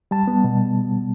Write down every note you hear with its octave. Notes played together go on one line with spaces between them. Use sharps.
G3 A5
B3
B2